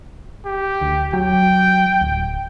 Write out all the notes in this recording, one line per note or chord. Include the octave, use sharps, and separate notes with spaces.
G4
D2
F#3 G5
D1